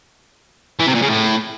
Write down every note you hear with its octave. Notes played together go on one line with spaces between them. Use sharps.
E3
C3
A#2
C#3
A2